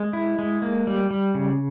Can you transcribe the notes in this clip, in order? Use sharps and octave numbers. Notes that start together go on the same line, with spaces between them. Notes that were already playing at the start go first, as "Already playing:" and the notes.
Already playing: G#3
E4
G#3
A#3
G3
G3
C#3